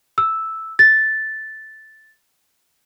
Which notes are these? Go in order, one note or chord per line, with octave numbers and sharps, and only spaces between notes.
E6
A6